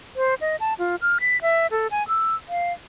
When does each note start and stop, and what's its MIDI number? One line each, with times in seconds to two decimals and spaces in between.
0.16 0.35 72
0.41 0.56 75
0.60 0.74 81
0.79 0.96 65
1.02 1.18 89
1.20 1.40 95
1.42 1.67 76
1.71 1.87 69
1.91 2.06 80
2.08 2.35 88
2.49 2.73 77